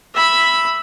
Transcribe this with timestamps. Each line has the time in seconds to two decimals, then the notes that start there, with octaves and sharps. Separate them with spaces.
0.15 E5 B5